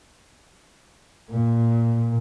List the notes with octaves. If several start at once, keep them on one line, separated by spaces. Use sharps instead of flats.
A#2